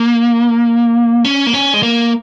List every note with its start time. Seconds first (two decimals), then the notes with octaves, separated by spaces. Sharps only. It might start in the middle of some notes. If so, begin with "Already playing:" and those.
Already playing: A#3
1.24 C#4
1.47 A#3
1.53 C#4
1.74 G#3
1.83 A#3